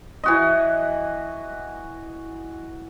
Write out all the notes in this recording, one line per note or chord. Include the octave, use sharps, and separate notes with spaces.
E3 F#4 D#5